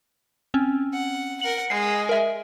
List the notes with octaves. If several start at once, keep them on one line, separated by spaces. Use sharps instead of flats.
C4 C#4
F#5
A#4 F#5 F#7
G#3 C7
A#4 E5